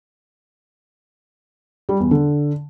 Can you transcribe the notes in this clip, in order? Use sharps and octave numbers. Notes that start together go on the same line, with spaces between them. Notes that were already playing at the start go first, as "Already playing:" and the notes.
G3
E2
D3